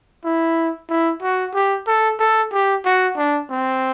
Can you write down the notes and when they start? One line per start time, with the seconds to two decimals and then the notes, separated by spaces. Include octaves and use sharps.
0.24 E4
0.89 E4
1.22 F#4
1.54 G4
1.87 A4
2.19 A4
2.52 G4
2.85 F#4
3.17 D4
3.50 C4